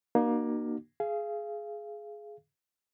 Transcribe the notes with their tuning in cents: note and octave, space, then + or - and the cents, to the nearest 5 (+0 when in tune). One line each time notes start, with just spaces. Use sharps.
A#3 +20 D#4 -40 F#4 +25
G#4 +15 F5 -25